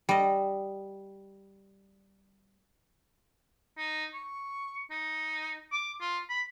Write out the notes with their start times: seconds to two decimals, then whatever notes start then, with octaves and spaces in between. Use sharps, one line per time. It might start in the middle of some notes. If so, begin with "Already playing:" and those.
0.09 G3 D#5
3.78 D#4
4.14 C#6
4.90 D#4
5.72 D6
6.01 F4
6.29 B5